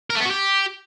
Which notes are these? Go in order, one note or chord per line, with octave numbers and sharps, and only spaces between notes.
A#4
A3
B3
F#4
G4